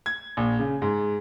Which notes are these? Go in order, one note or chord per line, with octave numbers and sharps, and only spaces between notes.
G#6
A#1
C#3
G#2